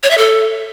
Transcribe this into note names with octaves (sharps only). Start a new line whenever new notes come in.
C#5
E5
A4